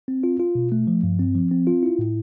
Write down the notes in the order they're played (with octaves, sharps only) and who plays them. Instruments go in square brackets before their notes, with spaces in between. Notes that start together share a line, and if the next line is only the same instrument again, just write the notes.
[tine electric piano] C4
F4
F4
B2
A3
F3
G2
C4
F3
C4
F4
E4
A2